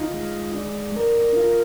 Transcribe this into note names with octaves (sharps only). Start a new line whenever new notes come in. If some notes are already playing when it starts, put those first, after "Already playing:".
Already playing: D#4 F4
G#3
D4
A#4
F4